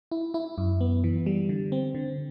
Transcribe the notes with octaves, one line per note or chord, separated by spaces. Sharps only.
E4
E4
F#2
B3
E3
G3
D3
C4
D3